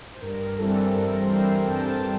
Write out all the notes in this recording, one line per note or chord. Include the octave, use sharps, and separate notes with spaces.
C5
G2 A#4
E3 G3 C4 A4
A4
G2 A#4
A#4
C5
E3 G3 C4
A#4
G5
G2 A5